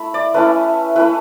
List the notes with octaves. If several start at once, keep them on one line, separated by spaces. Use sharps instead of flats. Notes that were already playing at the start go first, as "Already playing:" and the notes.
Already playing: A3 E4 B5
D5
A3 C#4 E4 B4
A3 C#4 E4 B4